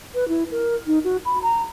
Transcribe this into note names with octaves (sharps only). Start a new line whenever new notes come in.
B4
E4
A#4
D#4
F#4
B5
A#5